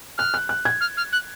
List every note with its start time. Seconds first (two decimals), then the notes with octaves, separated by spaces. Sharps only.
0.18 F6 F#6
0.34 F#6
0.49 F#6
0.65 G#6
0.81 F6
0.97 F6
1.12 F#6